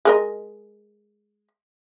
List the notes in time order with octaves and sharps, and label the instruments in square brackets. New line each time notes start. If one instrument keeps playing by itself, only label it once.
[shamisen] G#3 A#4 D#5